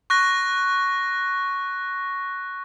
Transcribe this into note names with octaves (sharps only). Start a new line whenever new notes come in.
C#6 F#6 A#6